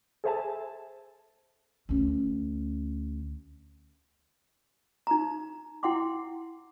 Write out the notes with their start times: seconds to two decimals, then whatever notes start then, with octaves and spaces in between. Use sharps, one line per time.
0.24 G#4 A4 C5 E5 G#5 A5
1.89 D2 C#4
5.07 D#4 A#5
5.83 E4 F#5 G5 C6 D6